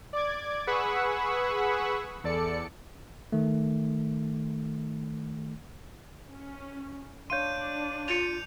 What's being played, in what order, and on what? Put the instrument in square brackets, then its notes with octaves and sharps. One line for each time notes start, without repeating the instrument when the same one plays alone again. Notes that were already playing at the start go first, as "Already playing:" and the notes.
[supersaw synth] D5 D6 G#6
G#4 B4 F#5 B5 C#6 E6
E2 A4 D5 C#7
[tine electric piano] D#3 A3
[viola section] C#4
[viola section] D4 [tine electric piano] C#5 F5 C6 [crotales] G6 D#7
[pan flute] F4 [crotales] C#7 D#7 F7